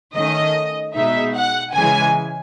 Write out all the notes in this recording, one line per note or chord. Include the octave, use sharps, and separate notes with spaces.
D#3 A3 C#4 D#5
B2 G#3 D#4 E5
F#5
C#3 E3 G#3 G#5